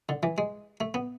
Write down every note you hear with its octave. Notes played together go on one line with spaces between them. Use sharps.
D3
E3
G#3
A3
B3